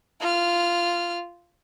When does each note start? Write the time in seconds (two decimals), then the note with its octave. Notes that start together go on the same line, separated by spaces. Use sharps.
0.21 F4 F6